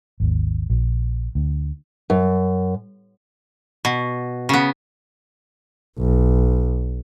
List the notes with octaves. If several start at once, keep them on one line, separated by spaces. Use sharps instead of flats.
G#1 D#2
A#1
D2
F#2
B2
C#3 B3
B1